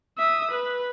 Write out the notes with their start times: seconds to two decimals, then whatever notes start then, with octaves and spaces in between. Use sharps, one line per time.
0.18 E5 D#6
0.51 B4